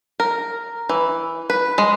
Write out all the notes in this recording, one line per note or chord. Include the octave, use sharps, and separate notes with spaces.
A#4
E3
B4
G#3